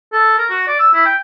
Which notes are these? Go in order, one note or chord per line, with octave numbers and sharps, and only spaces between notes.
A4
A#4
F#4
D5
E6
E4
G5